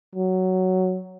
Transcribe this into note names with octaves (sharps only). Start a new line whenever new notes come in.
F#3